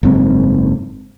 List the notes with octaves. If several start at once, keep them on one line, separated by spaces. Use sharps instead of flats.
F#1 G#2 C4